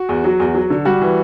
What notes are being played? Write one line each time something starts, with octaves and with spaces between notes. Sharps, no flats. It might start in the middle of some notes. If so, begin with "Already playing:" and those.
Already playing: F#4
E2
F#3
E2
F#3
D3
G3 F#4
E3